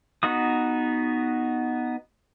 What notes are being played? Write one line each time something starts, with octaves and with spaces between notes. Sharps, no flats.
B3 D#4 F#4 D#6